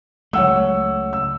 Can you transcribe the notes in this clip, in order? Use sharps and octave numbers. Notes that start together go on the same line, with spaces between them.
C#2 F#3 A3 C#5 F#5 E6
E6